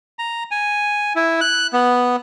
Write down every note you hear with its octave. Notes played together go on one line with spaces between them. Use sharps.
A#5
G#5
E4
F#6
B3